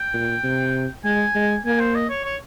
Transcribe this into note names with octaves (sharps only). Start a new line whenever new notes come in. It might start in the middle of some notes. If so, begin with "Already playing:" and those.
Already playing: G5
A#2
C3
G#3 G#5
G#3
A#3 G#5
C5
D#5
C#5
C#5